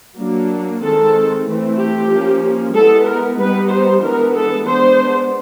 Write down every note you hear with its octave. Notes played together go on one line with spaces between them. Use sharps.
F#3 A#3 D4
D#3 G#3 C4 A4
E3 A3 C4 E4
G4
F3 A#3 C#4
G#3 B3 E4 A4
A#4
G3 B3 D#4 B4
C5
E3 G#3 B3 D4 A#4
A4
G#3 B3 D4 C5